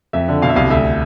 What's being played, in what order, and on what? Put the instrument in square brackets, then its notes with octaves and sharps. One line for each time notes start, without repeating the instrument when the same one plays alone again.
[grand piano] F2 E5
D3
B2 F5
E5
C2 F5
D2 E5